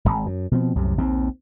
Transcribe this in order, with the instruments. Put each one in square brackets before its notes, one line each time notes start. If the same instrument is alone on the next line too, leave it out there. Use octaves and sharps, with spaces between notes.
[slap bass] D1 G#1
F#2
B2 F3 C4
C2 F#2 A2 C3
A#1 D#2 C4